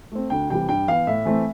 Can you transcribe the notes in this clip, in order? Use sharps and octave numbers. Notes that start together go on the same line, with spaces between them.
A3 C4
D2 G5
C3 E3 G3 G5
G2 G5
E3 B3 F5
A2 E5
E3 A3 C4